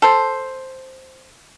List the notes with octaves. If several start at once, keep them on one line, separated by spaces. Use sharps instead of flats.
A4 C5